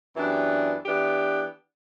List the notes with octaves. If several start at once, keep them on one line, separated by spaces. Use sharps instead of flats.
F#2 E3 B3 D4 G4
E3 B3 D4 G4